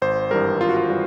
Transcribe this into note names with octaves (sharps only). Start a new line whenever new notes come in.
G#1 C5
G2 E3 G3 A#4
G#1 F4
F#4
F4
E3 G3 F#4